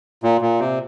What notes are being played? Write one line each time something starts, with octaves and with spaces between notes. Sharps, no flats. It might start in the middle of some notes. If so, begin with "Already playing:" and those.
A#2
A#2
C3